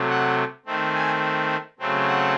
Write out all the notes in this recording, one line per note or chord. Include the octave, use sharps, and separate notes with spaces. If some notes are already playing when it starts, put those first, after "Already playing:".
Already playing: C3 F#3 A3
F#5
D#3 A3 C4
G#5
C#3 F#3 A3 C4
F#5